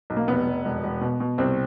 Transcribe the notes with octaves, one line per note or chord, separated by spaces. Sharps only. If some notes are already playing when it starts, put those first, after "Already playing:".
B1
A#3
F1 B3
F1
E1
E1
B2
B2
C2 C4